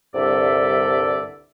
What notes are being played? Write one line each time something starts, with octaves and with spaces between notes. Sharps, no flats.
C2 G2 D3 A4 D5 E5